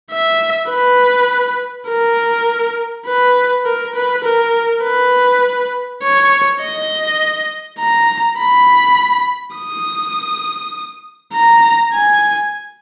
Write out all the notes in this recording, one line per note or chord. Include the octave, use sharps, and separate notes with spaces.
E5
B4
A#4
B4
A#4
B4
A#4
B4
C#5
D#5
A#5
B5
D#6
A#5
G#5